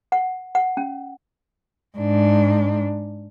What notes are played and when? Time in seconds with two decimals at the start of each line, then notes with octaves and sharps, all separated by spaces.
0.12 F#5
0.55 F#5
0.77 C#4
1.98 G#2 D4